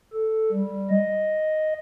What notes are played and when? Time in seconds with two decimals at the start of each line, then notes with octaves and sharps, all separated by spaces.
0.14 A4
0.52 G3
0.91 D#5